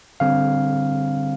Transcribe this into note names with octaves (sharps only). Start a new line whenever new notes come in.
D3 G3 C4 F5